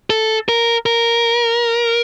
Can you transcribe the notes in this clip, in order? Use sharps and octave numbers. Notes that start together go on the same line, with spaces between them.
A4
A#4
A#4